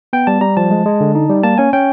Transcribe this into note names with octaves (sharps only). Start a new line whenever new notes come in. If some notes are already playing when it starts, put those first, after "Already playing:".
B3 G5
G3 A5
G3 A#5
F3 A5
G#3
G#3
D3
D#4
G3
A#3 A5
C#4 G#5
C#4 G5